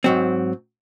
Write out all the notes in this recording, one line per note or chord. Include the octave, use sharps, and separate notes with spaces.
G#2 F#3 C4